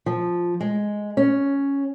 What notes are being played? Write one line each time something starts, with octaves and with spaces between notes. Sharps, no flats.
F3
G#3
C#4